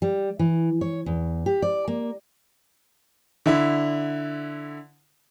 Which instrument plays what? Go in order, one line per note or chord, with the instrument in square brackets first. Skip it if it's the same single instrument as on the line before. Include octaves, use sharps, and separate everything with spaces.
[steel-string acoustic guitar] G3
E3
C#5
E2
G4
D5
A#3
[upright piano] D3 E4